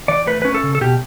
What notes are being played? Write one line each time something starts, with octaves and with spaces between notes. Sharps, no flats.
E3 D5
A3 B4
C#4 B4
A4
C#3
A4
B2 G4